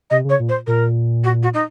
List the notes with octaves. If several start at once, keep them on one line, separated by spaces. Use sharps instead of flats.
C3 D#5
C#3
C#5
A#2
C5
A#2 A#4
F#4
F#4
D#4